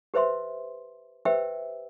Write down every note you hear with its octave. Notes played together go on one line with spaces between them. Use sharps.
G4 B4 C5 E5 C6
G4 B4 C5 E5 G5 E6